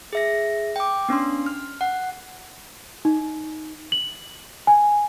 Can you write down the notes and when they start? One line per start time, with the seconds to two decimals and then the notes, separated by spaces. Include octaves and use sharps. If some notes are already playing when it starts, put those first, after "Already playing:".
0.13 G#4 E5 A#6
0.76 G5 D6
1.09 B3 C#4 D4 C6
1.46 F6
1.81 F#5
3.05 D#4
3.92 F#7
4.67 G#5